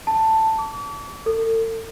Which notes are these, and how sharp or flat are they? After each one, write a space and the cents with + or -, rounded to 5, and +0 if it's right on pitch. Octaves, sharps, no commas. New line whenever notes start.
A5 +10
D6 -45
A4 +40